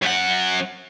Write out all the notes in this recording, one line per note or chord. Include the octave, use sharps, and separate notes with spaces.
F#2 F#5